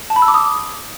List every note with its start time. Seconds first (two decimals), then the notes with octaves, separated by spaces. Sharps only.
0.10 A5
0.16 B5
0.22 E6
0.28 D6
0.34 D#6